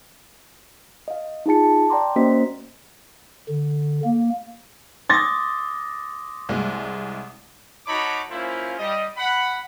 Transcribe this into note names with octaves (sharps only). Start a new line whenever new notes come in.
D#5 F5
D#4 F4 G#4 A5 C#7
A5
D5 G5 A#5 C6 D6
A#3 C#4 F#4 C5 D#5 B6
D3
A#3
C6 D6 D#6 A6 A#6
C2 G#3
D#4 F#4 C#5 A5 B5 D6
A#3 C#4 E4 F4 C5
G3 D#5
F#5 B5